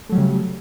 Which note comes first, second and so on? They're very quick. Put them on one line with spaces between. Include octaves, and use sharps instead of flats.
A3 F#3 G3 C#3